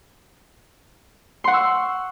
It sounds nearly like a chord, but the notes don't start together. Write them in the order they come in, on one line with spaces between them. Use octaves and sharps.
C6 F#5 C#6 E6